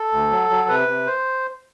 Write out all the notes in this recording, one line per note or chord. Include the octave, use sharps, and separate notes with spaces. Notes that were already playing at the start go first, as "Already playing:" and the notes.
Already playing: A4
D2
F#3
F#3
C3 B4
C3
C5